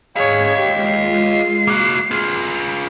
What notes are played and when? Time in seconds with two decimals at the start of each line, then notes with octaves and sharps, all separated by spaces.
0.16 G#2 C#4 G#4 C#5 D#5 F5
0.57 G#3 F4 G4
0.86 C7
1.68 A#3 F#4
2.11 F4 G#4 A#5 B5